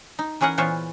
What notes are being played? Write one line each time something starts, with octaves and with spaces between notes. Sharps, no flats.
D#4
E3 C#4 G#4 A#4 F#5
A#2 E3 B3 F4 C5 C#5